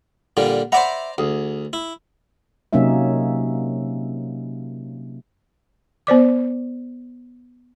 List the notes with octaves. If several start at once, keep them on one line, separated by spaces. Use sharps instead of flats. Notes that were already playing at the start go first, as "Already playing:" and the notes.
A#2 D3 G3
C5 D5 E5 F#5 A#5 B5
D2 G#4
E4
C3 F#3 A#3 C#4 D#4 E5
B3 C5 D5 D6